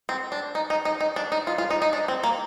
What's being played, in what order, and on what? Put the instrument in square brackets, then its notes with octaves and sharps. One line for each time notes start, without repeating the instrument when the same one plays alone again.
[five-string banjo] C4
D4
D#4
D#4
D#4
D#4
D4
D#4
F4
F4
D#4
D#4
D4
C4
A#3